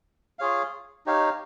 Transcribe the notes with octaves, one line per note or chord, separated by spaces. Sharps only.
F4 G#4 C#5 F5
D#4 G4 C#5 F5